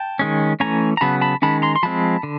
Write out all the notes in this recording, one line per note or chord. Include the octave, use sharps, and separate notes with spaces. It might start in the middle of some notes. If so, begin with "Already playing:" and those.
Already playing: G5 A5
D#3 G#3 C#4
E3 A3 C#4 G#5 A#5
A#5
C#3 F#3 B3 A5 B5
A5 B5
D#3 G#3 C#4 A5 B5
A#5 C6
C6
F3 G#3 C4 A5 B5
D3